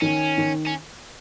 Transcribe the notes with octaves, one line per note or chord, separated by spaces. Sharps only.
D#3 C#4
D#3
C#4